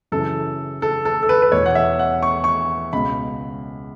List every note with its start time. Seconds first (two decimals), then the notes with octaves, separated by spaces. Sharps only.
0.12 F#2 C#3 E3 A4
0.82 A4
1.05 A4
1.23 A4
1.29 B4
1.42 B4
1.52 E2 B2 C#5
1.66 F#5
1.75 E5
1.99 F#5
2.22 C#6
2.44 C#6
2.93 C#2 B2 B5